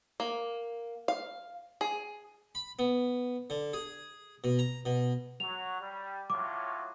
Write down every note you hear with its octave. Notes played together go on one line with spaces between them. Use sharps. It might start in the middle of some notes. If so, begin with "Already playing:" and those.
A#3
F5
G#4
B5
B3
D3
G#4
B2
A#5
B2
F#3 F7
G3
A2 F#3 F4 D6